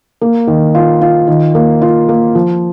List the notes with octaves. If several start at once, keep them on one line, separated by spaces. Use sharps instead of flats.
A#3
D#3
F4
F4
D#3
A#3
F4
A#3
F3